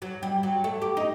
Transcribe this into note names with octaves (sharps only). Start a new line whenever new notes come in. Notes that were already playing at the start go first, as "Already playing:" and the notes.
F#3
G3
F#3
A3
G4
D#4